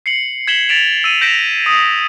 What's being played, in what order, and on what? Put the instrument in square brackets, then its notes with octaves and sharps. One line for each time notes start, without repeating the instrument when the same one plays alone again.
[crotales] C7 C#7 F#7
G#6 B6 E7 F#7 G7
A6 B6 D7 E7 F7
E6 D#7
G6 A#6 B6 D7 E7 F7
D#6